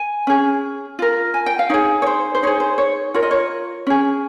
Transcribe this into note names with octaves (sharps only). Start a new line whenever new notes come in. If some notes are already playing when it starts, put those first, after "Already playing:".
Already playing: G#5
C#4 G#4
F4 A#4
G#5
G5
F5
D#4 G#4 C#5
C#5
C5
C5
D#4 G#4 C#5
C5
C#5
F4 A#4 C#5
D#5
C#5
C#4 G#4